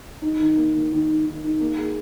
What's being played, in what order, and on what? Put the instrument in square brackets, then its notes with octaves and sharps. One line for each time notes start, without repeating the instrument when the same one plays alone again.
[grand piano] D#4
D#3
A#3
D#3
D#3
D#3
D#3
D#4
A#3
G#4